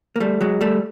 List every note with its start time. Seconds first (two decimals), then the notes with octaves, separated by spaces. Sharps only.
0.16 A#3
0.20 G3 A3
0.41 F#3 G#3
0.61 G3 A3